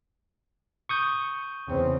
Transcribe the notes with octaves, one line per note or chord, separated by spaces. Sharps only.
C#6 D#6 G6
E2 C#3 C4